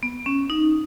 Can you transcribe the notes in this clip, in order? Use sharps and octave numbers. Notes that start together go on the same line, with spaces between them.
B3
C#4
D#4